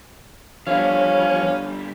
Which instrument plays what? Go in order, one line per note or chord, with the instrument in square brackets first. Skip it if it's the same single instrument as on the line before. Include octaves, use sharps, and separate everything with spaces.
[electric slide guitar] D3 G3 [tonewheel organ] F3 C#5 [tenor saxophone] C#4 [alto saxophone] F5